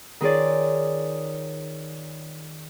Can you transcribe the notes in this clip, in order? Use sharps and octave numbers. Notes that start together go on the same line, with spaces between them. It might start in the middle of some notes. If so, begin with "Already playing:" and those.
D#3 D#4 F4 G#4 C#5 D5